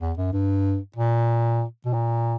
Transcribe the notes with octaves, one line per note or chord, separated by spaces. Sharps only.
E2
F#2
G2
A#2
B2
A#2